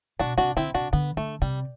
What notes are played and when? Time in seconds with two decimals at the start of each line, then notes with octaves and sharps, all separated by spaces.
0.19 B2 D4 F#4
0.38 C3 D4 F#4
0.56 D3 C4 E4
0.74 C3 D4 F#4
0.93 D3 B3
1.17 D3 A3
1.42 C3 G3